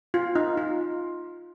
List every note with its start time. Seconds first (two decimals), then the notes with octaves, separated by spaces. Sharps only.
0.14 F4
0.35 D#4
0.57 F4